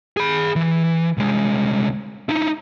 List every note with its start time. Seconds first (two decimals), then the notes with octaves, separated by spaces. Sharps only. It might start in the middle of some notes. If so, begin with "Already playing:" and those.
0.17 G#4 B5
0.56 E3
1.18 C2 G#3
2.29 D#4 E4